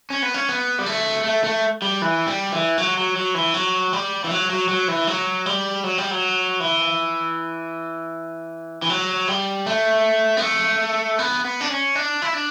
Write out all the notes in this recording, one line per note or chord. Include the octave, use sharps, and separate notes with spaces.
C#4
B3
C#4
B3
G3
A3
A3
A3
G3
E3
G3
E3
F#3
F#3
F#3
E3
F#3
G3
E3
F#3
F#3
F#3
E3
F#3
G3
F#3
G3
F#3
E3
E3
F#3
G3
A3
B3
A3
B3
B3
D4
C#4
D4
E4
D4